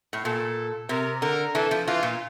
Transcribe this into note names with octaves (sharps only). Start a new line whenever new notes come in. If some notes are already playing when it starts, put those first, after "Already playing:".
A2
A#2 A4
C3 A#4
D3 A#4
E3 A4
F3
E3 F4
A#2